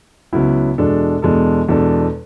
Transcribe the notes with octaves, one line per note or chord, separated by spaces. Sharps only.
C#2 C#3 F#3 B3 E4
E2 B2 G#3 D4 A4
E2 B2 G#3 D4 A4
E2 B2 G#3 D4 A4